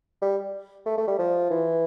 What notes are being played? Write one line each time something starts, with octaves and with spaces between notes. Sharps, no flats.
G3
A3
A3
G3
F3
E3